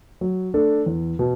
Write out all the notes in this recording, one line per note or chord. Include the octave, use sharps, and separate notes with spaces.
F#3
A3 D4 A4
E2
B2